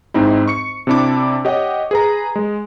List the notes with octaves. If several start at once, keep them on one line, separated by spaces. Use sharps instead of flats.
G#2 C4 D#4 E4
C#6 C#7
C3 C4 D4 E4 D6
G4 C#5 D#5 F#5
G#4 B4 A#5
G#3